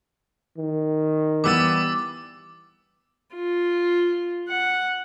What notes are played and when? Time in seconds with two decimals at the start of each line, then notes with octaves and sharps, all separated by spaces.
0.58 D#3
1.44 E3 G3 B3 D6 E6 A6
3.35 F4
4.49 F#5